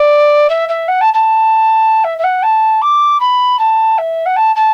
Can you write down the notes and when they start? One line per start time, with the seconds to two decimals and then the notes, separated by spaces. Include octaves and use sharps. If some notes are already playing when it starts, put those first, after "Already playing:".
Already playing: D5
0.50 E5
0.69 E5
0.88 F#5
1.01 A5
1.14 A5
2.04 E5
2.19 E5
2.24 F#5
2.43 A5
2.82 D6
3.20 B5
3.59 A5
3.98 E5
4.26 F#5
4.36 A5
4.56 A5